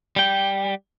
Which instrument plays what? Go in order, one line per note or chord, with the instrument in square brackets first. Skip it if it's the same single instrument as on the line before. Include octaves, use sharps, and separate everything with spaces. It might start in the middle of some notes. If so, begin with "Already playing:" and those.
[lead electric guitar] G3 G5